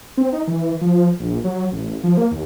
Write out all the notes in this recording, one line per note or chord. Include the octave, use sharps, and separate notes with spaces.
C4
D#4
E3
F3
A#1
F#3
A1
F3
A#3
D#2